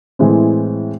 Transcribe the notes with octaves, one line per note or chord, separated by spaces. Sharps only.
A2 E3 G#3 C4